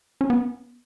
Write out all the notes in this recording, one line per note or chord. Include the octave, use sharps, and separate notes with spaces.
C#4
B3